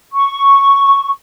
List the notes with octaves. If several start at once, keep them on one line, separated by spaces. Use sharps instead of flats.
C#6